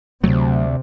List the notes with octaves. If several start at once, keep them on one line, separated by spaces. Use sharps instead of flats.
D2 C3 F#3 A3